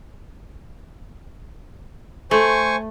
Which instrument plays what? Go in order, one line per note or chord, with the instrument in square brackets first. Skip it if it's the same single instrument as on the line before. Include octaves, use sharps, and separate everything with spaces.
[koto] A3 [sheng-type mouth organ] C5 G#5 C#6